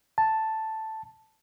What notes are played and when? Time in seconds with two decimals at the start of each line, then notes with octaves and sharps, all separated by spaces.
0.18 A5